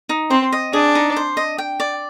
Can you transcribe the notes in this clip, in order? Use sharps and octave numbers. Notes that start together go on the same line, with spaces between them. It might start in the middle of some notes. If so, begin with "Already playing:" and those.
D#4
C4 C5
D#5
D4 G#4
D#4
C5
D#5
G5
D5